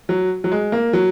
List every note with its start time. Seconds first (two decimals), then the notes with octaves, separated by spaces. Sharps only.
0.09 F#3
0.44 F#3
0.52 G#3
0.72 A#3
0.93 F#3